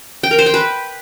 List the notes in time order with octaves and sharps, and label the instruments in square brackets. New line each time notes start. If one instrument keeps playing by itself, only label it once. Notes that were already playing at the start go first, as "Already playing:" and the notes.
[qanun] G5
A#4
C5
G5
B4